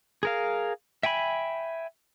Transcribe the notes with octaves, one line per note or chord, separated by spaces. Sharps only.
G#4 A#4 F5
E5 G5 G#5 B5